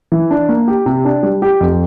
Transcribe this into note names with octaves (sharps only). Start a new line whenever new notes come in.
E3
D4
A#3
G4
C3
D4
G3
G4
F2